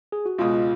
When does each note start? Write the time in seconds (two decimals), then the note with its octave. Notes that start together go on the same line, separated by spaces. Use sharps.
0.12 G#4
0.26 F#4
0.38 C#2 B2 G#3 F4